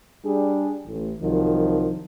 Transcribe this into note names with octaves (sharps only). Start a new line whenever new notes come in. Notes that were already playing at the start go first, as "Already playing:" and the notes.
G3 D4 G#4
A1
C2 D#3 F3 F#3